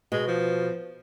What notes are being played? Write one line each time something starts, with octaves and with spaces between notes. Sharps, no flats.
B2 G#3
F3